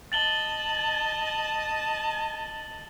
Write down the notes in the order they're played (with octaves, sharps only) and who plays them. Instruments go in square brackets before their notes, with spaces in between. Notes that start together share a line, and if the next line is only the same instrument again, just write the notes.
[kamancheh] D#5 A5 [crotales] A6 F#7 G7